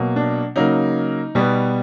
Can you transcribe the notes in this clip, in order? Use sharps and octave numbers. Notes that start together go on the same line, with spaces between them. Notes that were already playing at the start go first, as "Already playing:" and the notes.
Already playing: B2 F#3 A#3
D4
C#3 F#3 A#3 D#4
B2 G3 B3